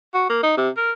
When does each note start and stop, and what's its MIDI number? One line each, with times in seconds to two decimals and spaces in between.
0.14 0.25 66
0.29 0.41 58
0.43 0.57 63
0.57 0.69 48
0.77 0.91 70